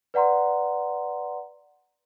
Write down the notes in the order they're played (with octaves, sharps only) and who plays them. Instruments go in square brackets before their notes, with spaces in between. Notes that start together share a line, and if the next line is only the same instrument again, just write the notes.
[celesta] B4 D5 F#5 A#5 C6